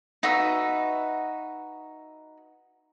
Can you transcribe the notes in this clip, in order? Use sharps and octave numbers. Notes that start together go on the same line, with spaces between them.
D#4 F#4 B4 E5